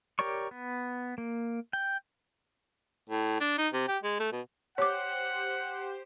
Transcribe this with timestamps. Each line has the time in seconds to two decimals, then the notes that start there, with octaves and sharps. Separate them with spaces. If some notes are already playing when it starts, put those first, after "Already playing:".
0.19 G4 A#4 C#5 D5 C#6
0.51 B3
1.18 A#3
1.73 G5
3.09 A2
3.40 D4
3.58 D#4
3.73 C3
3.88 G4
4.03 G#3
4.19 A3
4.32 B2
4.78 G4 C5 C#5 F#5 D6